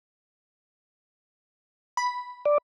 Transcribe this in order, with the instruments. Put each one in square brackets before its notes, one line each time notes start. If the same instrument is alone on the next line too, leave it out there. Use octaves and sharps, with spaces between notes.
[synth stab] B5
[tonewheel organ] D5